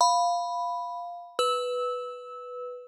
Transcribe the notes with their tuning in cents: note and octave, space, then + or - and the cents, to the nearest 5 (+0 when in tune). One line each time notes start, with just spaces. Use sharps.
F5 +0 B5 +0
B4 +0 E6 -20